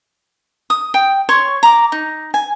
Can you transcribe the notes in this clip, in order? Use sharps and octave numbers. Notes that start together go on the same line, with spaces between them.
D#6
G5
C#5 C6 C#6
A#5 D6
D#4
G#5